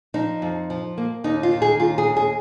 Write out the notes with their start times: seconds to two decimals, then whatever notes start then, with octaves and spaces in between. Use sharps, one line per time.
0.14 F3 D#4
0.42 F2
0.70 F3
0.98 A#3
1.24 D#2 D#4
1.43 F4
1.52 D#3
1.62 G#4
1.79 D#2 F4
1.98 G#4
2.07 D#2
2.17 G#4